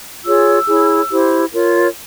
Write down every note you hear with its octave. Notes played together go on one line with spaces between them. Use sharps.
F4 G#4 C#5 E6
E4 G#4 C#5
E4 G4 C5
F4 A#4 C#5